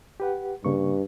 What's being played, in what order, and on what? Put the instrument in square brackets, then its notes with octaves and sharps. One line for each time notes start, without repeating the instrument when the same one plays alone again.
[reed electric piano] G4 B4 F#5
[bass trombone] G2 [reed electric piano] C#3 A#3 C#6